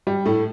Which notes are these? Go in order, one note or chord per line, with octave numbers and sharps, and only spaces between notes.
G3
A2 A3